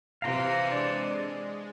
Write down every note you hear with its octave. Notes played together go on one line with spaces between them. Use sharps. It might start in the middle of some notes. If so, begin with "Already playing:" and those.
C3 E3 F5 A#5 C6 C7 D#7
G#3 D4 D5